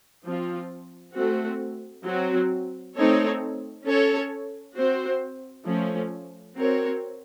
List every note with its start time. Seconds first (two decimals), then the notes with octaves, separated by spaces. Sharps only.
0.24 F3 C4 F4
1.15 A3 C4 F#4
2.05 F#3 C4 F#4
2.95 A3 C4 D#4 A4 C#5
3.85 C#4 A4 C#5
4.75 C4 F#4 C5
5.65 F3 A3 C#4
6.55 C4 F#4 A#4 C#5